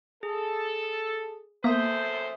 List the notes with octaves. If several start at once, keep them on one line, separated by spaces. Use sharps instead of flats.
G#4 A4
F#2 A#3 B3 A4 C5 E5 D#6